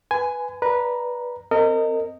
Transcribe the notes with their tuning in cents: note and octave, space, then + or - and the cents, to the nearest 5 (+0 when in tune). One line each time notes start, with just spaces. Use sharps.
B4 +0 G#5 +5 B5 +45
B4 -15 D5 +0 A#5 +0
C4 +0 A#4 -35 D#5 +0